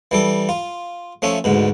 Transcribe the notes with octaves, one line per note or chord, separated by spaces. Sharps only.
E3 G3 A4
F4
F3 A3 C#4 E5
D2 G#2 B2